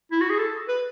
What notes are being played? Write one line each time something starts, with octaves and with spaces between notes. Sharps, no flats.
E4
F#4
G#4
A4
B4